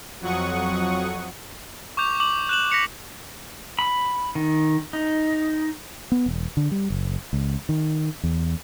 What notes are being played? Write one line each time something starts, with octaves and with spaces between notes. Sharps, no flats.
F2 F#3 F#5 C#6 D#6
C#6 D6 G6 F7
D6 F#7
F#6 E7 F#7
A#6 B6 C#7 F7
B5
D#3
D#4
B3
E1
D3
G3
F#1
C#2
D#3
E2